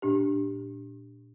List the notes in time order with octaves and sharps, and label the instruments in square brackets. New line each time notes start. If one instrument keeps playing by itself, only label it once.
[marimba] A#2 D4 G4